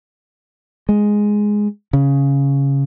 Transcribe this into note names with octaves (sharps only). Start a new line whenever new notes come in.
G#3
C#3